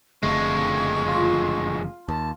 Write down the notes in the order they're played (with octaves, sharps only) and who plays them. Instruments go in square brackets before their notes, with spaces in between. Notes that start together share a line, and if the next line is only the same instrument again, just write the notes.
[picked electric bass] F#1 D3 A3 [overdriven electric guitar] F2 G#3 [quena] C#6
[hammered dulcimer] F4
[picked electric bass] D#2 [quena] A5